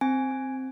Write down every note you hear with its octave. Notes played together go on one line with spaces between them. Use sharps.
C4 G#5
C4